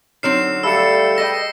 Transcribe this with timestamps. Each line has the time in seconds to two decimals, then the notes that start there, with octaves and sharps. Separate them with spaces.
0.23 D3 F#3 C4 D#4 C#5 F6 C7 E7
0.63 G3 A3 A4 F5 B5 E6 C#7
1.18 G#4 B4 D#5 G5 A#6